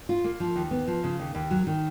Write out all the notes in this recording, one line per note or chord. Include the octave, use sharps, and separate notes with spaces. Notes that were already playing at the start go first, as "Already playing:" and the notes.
F4
A#3
F3
D#2
B3
F3
C#3
D#2
D#2
F#3
D#3